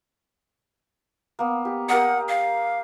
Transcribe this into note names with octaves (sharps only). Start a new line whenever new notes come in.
A#3 B3
G4
G4 A#4 D#5 F#5
F5